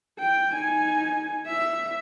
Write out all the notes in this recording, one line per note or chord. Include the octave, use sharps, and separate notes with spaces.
G5
D#4 G#5
E5